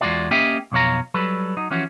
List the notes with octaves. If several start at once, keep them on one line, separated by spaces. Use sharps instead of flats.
E2 G#3 A#3 F4 F#4 D5
A#3 C#4 G4 D#5 E5 G5
B1 F2 B2 C#5 F5 A#5
F#3 G3 A4 B4
F#3 D#4
E3 F3 C#4 F#4